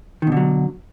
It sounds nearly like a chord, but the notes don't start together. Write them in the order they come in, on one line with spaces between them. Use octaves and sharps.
D#3 B2 D3 F#3